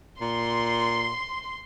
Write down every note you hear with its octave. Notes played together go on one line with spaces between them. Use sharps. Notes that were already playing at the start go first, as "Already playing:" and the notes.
A#2 C6